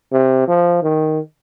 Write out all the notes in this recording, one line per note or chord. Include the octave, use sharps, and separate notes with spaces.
C3
F3
D#3